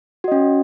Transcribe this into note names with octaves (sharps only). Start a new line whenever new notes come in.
C#4 F#4 D#5